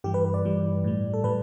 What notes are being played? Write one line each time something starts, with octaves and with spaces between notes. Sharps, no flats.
G2 E3 G3 G4
B4
B4
D5
G2 E3 G3
A2 G3
A4
A2 G3 B4